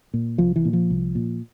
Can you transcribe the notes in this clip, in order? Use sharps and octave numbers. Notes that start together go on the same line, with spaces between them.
A#2
C2 F3
E3
A#2
F3
C2
A#2